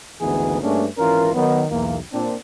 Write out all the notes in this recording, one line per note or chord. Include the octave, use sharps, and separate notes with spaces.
G#1 D2 E3 B3 D#4 G#4
G2 A3 A#3 C#4 D4 G#4
G#1 E3 C#4 F4 A#4
D#3 F#3 B3
B1 E2 A#3
A#2 C4 D4